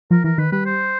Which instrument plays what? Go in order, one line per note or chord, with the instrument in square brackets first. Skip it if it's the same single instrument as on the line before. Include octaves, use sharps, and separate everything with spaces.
[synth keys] F3 [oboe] A#4
[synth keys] E3 [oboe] A#4
[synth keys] D#3 [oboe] B4
[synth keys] G3 [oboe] B4
[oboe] C5